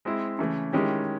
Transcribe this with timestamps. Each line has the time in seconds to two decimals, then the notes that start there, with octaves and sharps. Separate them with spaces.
0.05 G#3 C4 E4
0.39 C#3 E3 A3
0.73 D#3 G#3 C#4 E4 G4